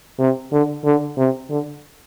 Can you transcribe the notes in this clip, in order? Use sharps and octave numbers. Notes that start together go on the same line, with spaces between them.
C3
D3
D3
C3
D3